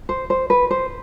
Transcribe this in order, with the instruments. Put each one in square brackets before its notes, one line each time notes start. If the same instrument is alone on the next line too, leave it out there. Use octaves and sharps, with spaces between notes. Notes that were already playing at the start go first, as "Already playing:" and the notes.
[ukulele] C5
C5
B4
C5